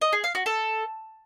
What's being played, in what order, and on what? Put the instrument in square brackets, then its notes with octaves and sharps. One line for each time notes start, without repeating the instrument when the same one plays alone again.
[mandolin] D#5
G#4
F5
F#4
A4